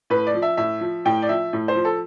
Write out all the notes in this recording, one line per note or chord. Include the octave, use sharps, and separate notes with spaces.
A2 B4
D5
F3
E5
A2 E5
F3
A2 G5
D5
F3 E5
A2
C5
F3
A4